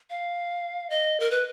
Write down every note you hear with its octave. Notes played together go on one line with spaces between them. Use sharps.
F5
D#5
A#4
B4